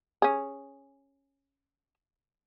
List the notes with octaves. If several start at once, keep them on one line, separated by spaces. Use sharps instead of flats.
C#4 G#4